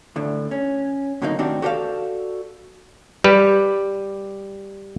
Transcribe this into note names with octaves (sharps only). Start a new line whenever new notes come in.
D2 A2 D3
C#4
A2 D3 F#3 A#3 C4 D#4
A2 D#3 C4 D4 F#4 G4
F#4 G4 A4 C5 D5 F5
G3 G4 B4